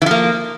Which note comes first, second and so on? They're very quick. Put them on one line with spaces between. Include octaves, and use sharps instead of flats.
E3 F3 A#3